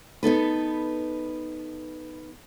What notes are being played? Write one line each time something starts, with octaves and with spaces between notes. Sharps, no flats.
B3 D#4 A4 B4